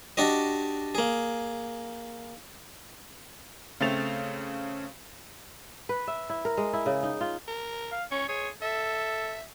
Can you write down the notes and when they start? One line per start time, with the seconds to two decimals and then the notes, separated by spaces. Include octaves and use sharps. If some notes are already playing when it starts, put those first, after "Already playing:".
0.17 D4 F#4 G4 D#5
0.95 A#3 G#4
3.80 C#3 A3 C4 A6 F7
5.89 B4
6.07 E5
6.30 E4
6.45 A#4
6.57 G#3
6.73 E4
6.86 C#3
7.03 D#4
7.21 F4
7.48 A#4
7.92 F5
8.11 C#4 C#5
8.29 G#4 C#5
8.62 A4 E5